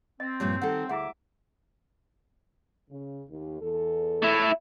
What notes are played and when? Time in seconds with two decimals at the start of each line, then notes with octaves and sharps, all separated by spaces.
0.20 C4 D#5
0.40 G2 A#2 F3 F#4 G4 C#5
0.62 D#3 A4 F#5
0.89 D2 E4 G#4 E5 F#5 D6
2.90 C#3
3.28 D#2
3.62 E2 A4
4.22 A3 E4